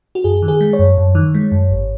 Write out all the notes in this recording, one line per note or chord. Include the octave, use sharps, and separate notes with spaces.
F#4
F#2 G#4
D#3
G#4
G#3
C#5
F#2
F#2
D#3
G#3
F#2
G#1